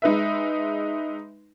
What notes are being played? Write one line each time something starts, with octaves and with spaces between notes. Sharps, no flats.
G#3 D#4 B4 E5